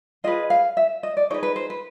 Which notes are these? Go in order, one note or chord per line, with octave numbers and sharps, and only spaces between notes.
F4 G#4 B4 D#5
F5
E5
D#5
D5
D#4 G#4 B4 C#5
B4
C5
B4